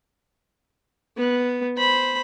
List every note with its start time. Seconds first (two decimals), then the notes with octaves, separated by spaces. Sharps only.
1.17 B3
1.77 C5 B5